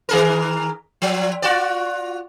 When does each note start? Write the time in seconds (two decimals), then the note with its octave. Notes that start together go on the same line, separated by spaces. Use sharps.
0.09 D#3 G#4 A#4
1.02 F3
1.42 F4 F#4 D5